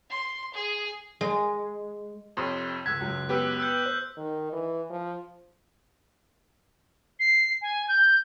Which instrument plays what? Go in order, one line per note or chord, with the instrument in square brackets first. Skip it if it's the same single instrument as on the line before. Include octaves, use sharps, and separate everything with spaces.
[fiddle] C6
G#4
[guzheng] G#3
[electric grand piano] F2 C3 [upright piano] C#5 C6 D#6
[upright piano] C#2 E6 [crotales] F#6 B6 [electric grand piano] G#6
[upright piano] C#2 F#2
[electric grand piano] B3 G4 B4 [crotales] E6 F#6
[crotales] E6 F#6 G6
[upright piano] C5
[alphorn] D#3
E3
F3
[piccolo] C7
G#5
G6